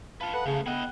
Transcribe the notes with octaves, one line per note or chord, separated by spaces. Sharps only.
F4 B4 F5 A5
A4 B4 F#5
C#3 A3 C#4
B3 E4 D#5 G5 F#6